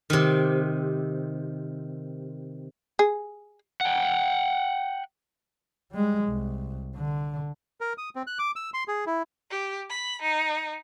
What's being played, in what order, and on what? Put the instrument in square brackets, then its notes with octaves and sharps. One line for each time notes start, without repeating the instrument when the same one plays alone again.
[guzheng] C3 D#3
[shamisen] G#4
[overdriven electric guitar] F#5 G5
[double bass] G3 G#3
C2
D3
[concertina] A#4
D#6
C4
F#6
D6
E6
C6
G#4
E4
[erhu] G4
B5
D#4